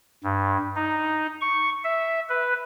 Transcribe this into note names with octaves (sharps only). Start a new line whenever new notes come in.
G2
D#4
C#6
E5
B4